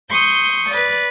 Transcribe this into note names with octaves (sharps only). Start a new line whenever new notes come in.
C6 C#6 D#6 G6
B4 D5